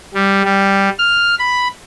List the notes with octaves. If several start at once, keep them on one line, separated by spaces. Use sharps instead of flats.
G3
G3
F6
B5